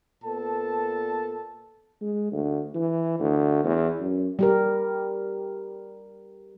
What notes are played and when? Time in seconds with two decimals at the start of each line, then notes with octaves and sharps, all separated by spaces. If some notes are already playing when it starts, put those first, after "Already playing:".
0.24 A#2 B3 A4 A5
2.01 G#3
2.32 D2
2.75 E3
3.20 D2
3.64 E2
4.00 F#2
4.39 G3 G4 A#4